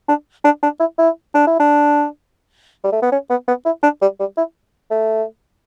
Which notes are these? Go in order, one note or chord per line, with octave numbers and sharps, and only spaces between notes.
D4
D4
D4
E4
E4
D4
E4
D4
G3
A3
B3
C#4
B3
B3
E4
D4
G3
G3
E4
A3